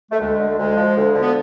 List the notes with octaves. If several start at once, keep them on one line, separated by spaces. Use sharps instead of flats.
A3
D2 G#3
D3
D2 G#3
F3
D2
D3
B3